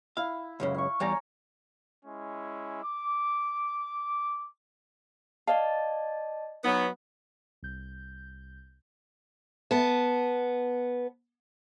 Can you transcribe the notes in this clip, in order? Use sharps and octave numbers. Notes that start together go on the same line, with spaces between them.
E4 F5
C#2 F#2 C#3
F5 C#6
E2 G3 C#5 G#5 A#5
G#3 C#4 E4
D6
D5 D#5 F5 A5
F#3 B3 D#4
C2 G6
B3 A5